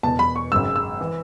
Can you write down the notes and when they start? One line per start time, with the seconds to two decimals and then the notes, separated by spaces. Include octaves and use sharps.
0.03 E1 E2 B2 A5
0.19 B5
0.36 C#6
0.51 G#1 F#2 C#3 G#3 E6
0.76 E6
1.01 E3